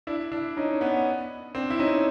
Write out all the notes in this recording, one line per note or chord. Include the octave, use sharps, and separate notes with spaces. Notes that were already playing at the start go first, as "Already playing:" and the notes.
D4 E4
D4 E4
C#4 D#4
B3 C#4
C4 D4
E4
C#4 D#4